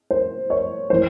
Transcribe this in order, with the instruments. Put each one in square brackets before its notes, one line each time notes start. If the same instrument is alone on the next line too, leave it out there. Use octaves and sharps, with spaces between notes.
[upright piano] C5
C#5
E3 C5